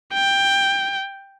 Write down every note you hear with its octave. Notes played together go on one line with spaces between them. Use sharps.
G5